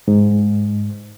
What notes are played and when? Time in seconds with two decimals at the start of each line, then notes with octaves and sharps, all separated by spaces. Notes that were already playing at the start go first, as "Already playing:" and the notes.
0.08 G#2